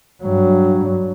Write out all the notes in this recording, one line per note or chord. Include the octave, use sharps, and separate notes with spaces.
G2 F#3